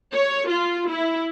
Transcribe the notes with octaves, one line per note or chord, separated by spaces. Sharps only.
C#5
F4
E4